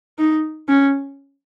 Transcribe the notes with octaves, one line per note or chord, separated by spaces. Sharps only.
D#4
C#4